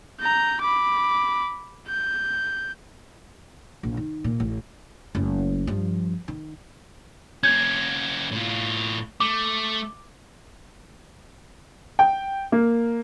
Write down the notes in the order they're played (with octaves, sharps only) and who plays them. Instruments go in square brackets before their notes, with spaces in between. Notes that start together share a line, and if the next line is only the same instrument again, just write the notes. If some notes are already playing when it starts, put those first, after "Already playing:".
[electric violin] A#5 G6
B5 D6
G6
[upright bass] A#1
D#3
A#2
A1
F#1 A3
G2 F3
D#3
[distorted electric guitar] A#3 C#4 [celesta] G6 G#6
[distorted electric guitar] A2 F4
[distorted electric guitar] A3 [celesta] D6
[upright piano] G5
A#3